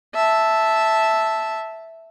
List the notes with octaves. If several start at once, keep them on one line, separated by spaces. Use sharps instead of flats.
E5 A5